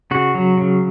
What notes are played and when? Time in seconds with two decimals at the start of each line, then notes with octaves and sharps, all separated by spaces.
0.11 C#3 F#4
0.35 F#3
0.58 C#3